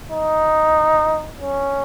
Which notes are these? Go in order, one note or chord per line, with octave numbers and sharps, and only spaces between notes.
D#4
C#4